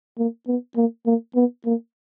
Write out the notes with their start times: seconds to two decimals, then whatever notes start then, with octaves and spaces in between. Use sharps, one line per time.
0.18 A#3
0.48 B3
0.76 A#3
1.06 A#3
1.36 B3
1.65 A#3